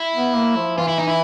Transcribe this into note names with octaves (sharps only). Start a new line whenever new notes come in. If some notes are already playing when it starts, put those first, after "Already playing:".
Already playing: E4
B3
A#3
F3
E3 F4
E4
D#4
E4